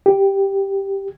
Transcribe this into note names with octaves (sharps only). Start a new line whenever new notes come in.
G4